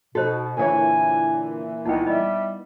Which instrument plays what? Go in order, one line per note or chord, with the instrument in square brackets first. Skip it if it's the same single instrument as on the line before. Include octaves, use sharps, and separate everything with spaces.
[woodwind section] B2 [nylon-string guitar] D#4 A4 [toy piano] F#4 C5
[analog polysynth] A#2 E3 [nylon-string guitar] D3 C#5 [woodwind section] G#5
[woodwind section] C#2 [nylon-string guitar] B3 [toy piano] D#4 E4 G5
[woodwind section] G3 E5 [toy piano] D#5